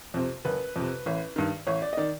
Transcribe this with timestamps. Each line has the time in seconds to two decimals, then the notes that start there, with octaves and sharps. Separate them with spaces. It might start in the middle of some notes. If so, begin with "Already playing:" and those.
0.14 F2 C3
0.45 F#1 B4
0.76 F2 C3
1.06 A1
1.36 G2 D#3
1.67 A1 C#5
1.82 D5
1.93 D#5
1.97 D#3 D5